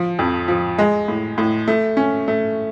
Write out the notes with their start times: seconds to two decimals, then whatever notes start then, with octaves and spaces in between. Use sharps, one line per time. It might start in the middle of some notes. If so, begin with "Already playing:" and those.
Already playing: F3
0.19 F2
0.48 F3
0.78 G#3
1.08 A2
1.38 A2
1.68 A3
1.97 C#4
2.28 A3